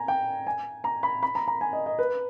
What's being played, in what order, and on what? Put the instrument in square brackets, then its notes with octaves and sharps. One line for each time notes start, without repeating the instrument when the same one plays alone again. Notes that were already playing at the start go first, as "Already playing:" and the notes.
Already playing: [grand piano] G#5 A#5
G5
G#5
A#5
B5
B5
A#5
A#5
G#5
D#5
D#5
B4